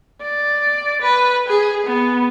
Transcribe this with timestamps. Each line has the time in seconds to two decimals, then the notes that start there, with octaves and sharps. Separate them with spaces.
0.22 D5
1.02 B4
1.48 G#4
1.86 B3